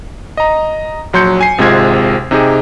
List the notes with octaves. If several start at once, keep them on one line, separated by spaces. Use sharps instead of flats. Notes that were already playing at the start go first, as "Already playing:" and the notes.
D#5 A#5
A#1 F#3 C6 G6 C#7
G#5 C7
G#1 C3 G#3 F4 G#6
C3 D#4 G4 G#4